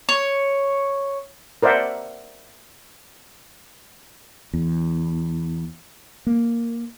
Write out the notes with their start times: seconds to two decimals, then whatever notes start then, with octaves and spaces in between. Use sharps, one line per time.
0.09 C#5
1.63 A#4 C5 D5 E5 F#5
4.54 E2
6.27 A#3